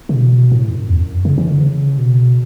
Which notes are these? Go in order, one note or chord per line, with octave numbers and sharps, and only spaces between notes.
C#3
B2
A2
F#2
E2
F#2
C#3
E3
D3
C#3
B2